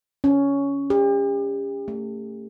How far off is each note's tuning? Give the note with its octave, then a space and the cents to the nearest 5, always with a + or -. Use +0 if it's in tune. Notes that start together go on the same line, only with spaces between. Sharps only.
C#4 +10
G4 +40
A3 +30